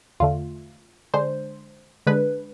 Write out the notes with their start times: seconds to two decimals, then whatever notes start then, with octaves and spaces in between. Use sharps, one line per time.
0.20 E2 D3 A3 F4
1.14 D3 G#3 D4 C5
2.07 D3 G#3 D4 B4